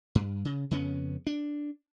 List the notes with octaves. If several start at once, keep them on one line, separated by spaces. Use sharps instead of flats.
G2
C#3
F2 C#3 B3 C#4
D4